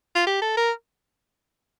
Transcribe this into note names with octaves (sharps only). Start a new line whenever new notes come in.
F4
G4
A4
A#4